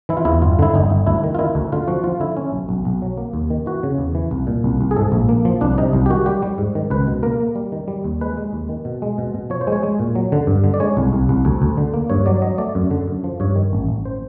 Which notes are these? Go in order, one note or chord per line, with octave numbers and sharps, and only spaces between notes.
E3 E4
F4
E2 E4
G1 F4
D3 E4
G1 D#4
G1
D2 E4
D#3
F4
D#3 E4
D2
D3 F4
F3 F#4
F3 F4
D3 E4
C#4
B1
B1
B1
F#3
A#3
D#2
D#3
E3 F#4
C#3
E2
E3
C2
A#2
C2
C2
G#4
G#2 A4
A#1
A#3
F3
C2 D4
C3 D#4
C2
G4
D#3 F#4
G3 G4
G3
G#2
D#3
C#2 B4
B2
A#3 A#4
A#3
G3
D#3
G3
D#2
G#3 B4
G#3
D#2
D#3
B2
G#3
B2
B2
F3 C#5
C5
G#3
C#5
G#3
A#2
F#3
D3
G2
D3
D5
G#3 C#5
C2
C2
C2
D2
D2
D3
A#3
G2 C#5
F#3 D5
F#3 D#5
A3 D5
F#2
D3
F#2
F3
G2 C#5
D#3
A1
A1
C5